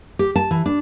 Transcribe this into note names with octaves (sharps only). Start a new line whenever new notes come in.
G4
A5
E3
D4